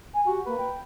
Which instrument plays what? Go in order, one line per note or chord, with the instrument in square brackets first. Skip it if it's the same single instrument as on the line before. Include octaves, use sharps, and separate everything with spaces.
[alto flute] G#5
[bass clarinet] F#4 [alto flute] G4
[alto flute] A#3 [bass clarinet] B4
[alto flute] G5